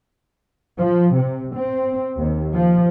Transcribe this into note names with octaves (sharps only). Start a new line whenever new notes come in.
F3
C3
C4
D#2
F3